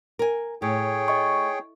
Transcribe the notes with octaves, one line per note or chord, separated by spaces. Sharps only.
A#4 G#5
A2 G#4 C#5 G5
D#5 C#6